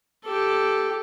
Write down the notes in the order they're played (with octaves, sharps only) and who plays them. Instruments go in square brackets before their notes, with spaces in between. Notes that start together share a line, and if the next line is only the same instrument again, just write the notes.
[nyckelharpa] G4 A4